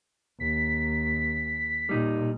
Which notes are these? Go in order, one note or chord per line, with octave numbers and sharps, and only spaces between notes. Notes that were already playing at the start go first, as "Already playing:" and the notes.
D#2 B6
A#2 G3 D#4